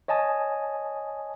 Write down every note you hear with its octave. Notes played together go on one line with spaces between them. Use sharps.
C#5 D#5 G#5 A5 D#6